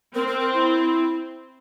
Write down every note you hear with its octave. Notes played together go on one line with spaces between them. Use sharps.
C4 A#4
A#4
A#4
E4